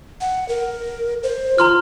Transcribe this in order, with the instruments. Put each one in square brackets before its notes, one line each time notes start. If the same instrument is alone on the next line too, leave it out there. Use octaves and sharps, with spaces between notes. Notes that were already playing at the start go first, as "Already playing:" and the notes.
[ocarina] F#5
A#4
C5
[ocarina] F4 [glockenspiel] A#5 C6 F6